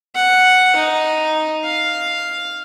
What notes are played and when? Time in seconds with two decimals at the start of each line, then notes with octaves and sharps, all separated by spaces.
0.15 F#5
0.75 D#4
1.64 F5